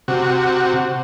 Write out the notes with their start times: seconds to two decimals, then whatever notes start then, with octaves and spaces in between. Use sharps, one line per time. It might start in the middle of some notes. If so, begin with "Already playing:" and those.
0.08 C3 F#4